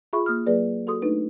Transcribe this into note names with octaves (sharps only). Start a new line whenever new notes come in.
F4 G#4 E5 B5 C#6
A#3 D#6 F6
F#3 A#3 G#4 B4 D5
F#4 A4 C6 D#6
A3 D4 D#4 B4